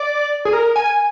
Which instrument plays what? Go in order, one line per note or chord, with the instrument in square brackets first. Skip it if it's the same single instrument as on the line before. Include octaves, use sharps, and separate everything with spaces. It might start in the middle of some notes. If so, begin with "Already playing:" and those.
Already playing: [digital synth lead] D5
G#4
A#4
G#5